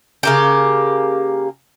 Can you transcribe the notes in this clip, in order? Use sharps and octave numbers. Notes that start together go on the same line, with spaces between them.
C#3 A#3 G4